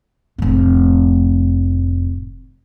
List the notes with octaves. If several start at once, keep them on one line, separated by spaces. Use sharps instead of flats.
F1 A2